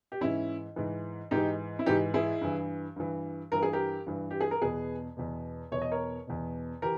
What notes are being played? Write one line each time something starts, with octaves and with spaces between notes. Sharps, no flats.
G4
G#2 E3 C#4 E4
G#2 E3
G#2 E3 D#4 G4
E4
G#2 E3 D#4 G4
E4 G#4
G2 E3
G2 E3
G2 E3 A#4
G#4
G4 A#4
G2 E3
G4
G#4
A#4
E2 B2 G#4 B4
E2 B2
E2 B2 C#5
D#5
A#4 C#5
E2 B2
E3 G4 A#4